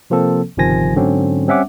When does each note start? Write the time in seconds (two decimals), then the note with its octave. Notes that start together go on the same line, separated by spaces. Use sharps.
0.10 C3 F3 A#3 C4 A4
0.57 G1 C3 D#3 F3 G#5 A#6
0.96 G#2 D3 F#3 C4 C#4
1.47 G3 C4 C#4 E5 F#5 D6